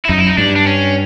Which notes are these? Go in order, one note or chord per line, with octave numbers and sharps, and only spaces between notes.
E4
F#2 D#4
E4
D#4
G2 D4
D4
C#4